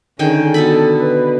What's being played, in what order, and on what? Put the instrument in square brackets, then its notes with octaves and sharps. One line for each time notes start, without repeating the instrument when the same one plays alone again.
[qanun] D3 D#3 G5 [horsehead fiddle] C#4 G#4
[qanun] B2 B3 B5 [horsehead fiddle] A4
[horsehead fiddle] B4